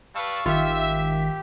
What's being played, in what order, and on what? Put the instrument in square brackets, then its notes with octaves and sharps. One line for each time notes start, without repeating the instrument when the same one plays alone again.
[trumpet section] G3 B4 A5 [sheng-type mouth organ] F5 C#6 E6
[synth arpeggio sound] G#1 D#3 B6 [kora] F4 [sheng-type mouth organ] G4 [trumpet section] E5